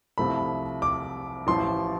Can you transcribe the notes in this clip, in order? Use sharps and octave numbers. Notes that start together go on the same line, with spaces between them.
C2 C3 F3 A3 B5
D6
A1 A2 F3 C6